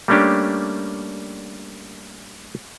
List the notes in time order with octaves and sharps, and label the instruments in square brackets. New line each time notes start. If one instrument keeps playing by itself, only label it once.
[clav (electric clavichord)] G3 A3 A#3 C#4 D4 G4